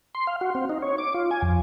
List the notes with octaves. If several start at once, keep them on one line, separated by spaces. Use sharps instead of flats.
C6
F5
F#4
C4
D#4
C#5
D6
F4
G#5
F2